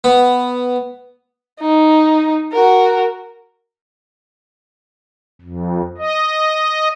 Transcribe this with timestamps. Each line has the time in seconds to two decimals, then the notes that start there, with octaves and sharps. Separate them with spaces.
0.04 B3
1.60 D#4
2.52 F#4 A#4
5.42 F2
5.98 D#5